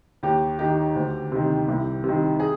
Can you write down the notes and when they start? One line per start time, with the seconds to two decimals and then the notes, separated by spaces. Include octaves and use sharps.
0.23 D#2 G4
0.59 D#3 G4
0.95 D2
1.32 C3 D#3
1.68 C2
2.04 C3 D#3
2.40 G#4